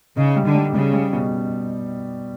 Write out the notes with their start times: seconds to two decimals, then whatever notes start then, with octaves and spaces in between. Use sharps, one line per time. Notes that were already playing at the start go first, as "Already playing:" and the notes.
0.17 C#3 D#4
0.36 G3
0.46 D3
0.55 G3
0.74 C#3 G3
0.93 G3
1.13 B2